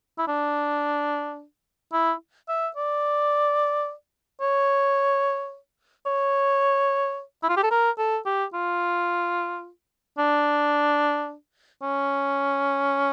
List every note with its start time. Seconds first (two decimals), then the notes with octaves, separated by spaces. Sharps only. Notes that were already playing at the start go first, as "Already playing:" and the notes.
0.18 E4
0.28 D4
1.93 E4
2.49 E5
2.76 D5
4.41 C#5
6.06 C#5
7.43 E4
7.49 F4
7.57 G4
7.63 A4
7.71 A#4
7.98 A4
8.25 G4
8.54 F4
10.18 D4
11.82 C#4